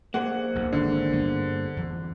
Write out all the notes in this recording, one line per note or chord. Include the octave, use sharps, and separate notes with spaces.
A#3 G#4 C5 F#5
B1 E2 G2
G#1 D3
G2 G3 B3
F2 E3 F3